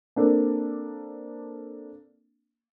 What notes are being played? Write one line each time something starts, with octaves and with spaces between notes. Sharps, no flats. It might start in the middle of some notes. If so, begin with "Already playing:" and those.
A#3 C4 D4 A4